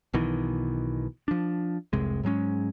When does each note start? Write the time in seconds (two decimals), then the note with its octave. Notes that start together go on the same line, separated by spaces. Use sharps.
0.13 B1 B2 D#3 E3
1.28 F3 D4
1.93 F1 C2 C3 G#3
2.23 G#2 F#3 G#3 C#4